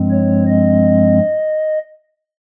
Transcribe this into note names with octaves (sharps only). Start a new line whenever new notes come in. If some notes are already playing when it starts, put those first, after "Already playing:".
Already playing: G2 F3 G#3 C4
C#5
D#5